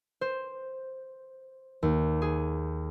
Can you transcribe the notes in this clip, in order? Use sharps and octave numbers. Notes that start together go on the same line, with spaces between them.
C5
D#2
G#4